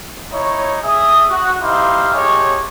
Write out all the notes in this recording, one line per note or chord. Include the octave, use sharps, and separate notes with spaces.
D#4 E4 C#5
G#4 E5 D#6
F#4
D#4 E4 G4 C5 F5
G#3 A3 G4 C#5